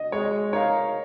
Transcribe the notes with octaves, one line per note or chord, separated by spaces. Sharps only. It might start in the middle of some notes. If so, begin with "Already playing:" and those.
Already playing: D#5
G#3 C#5
D#4 A#4 C#5 F5